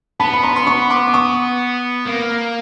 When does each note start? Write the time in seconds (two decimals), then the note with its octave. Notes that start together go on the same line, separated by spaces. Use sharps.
0.20 B3 A5 B5
0.33 B5
0.43 A#5 C6
0.56 C6
0.67 B5 C#6
0.90 C6 D6
1.08 D6
1.14 C#6 D#6
2.07 A#3